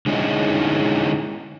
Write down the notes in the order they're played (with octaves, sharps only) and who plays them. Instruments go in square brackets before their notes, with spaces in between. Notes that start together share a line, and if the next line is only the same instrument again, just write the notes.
[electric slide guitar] D3 G#3 C#4 D#4 E4